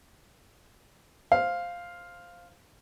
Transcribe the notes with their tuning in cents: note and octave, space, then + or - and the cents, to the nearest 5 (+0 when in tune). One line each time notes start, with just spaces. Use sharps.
C5 +0 F5 +0